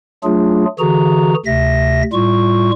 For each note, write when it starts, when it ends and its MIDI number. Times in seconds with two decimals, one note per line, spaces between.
0.24 0.65 54
0.24 0.65 57
0.24 0.65 62
0.24 0.65 65
0.24 0.65 68
0.79 1.34 50
0.79 1.34 52
0.79 1.34 66
0.79 1.34 68
0.79 1.34 82
1.46 2.03 38
1.46 2.03 48
1.46 2.03 76
1.46 2.03 94
2.13 2.71 45
2.13 2.71 55
2.13 2.71 65
2.13 2.71 85